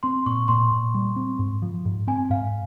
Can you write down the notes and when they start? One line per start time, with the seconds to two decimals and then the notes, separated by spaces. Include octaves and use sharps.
0.03 C4 C6
0.26 A#2 C#6
0.48 A#2 C6
0.72 A#2
0.94 G3
1.16 C4
1.39 G#2
1.62 F3
1.85 G#2
2.07 C4 G#5
2.30 G#2 F5